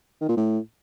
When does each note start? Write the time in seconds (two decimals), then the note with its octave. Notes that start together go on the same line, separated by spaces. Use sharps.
0.21 D#3
0.29 A#2
0.37 A2